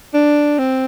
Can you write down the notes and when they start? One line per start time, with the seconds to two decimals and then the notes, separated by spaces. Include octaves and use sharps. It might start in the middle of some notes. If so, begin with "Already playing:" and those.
0.14 D4
0.59 C4